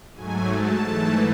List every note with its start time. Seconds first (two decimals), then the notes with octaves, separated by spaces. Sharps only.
0.14 G#2 F#3 A3 G#5
0.50 A5
0.85 G#2 E3 A3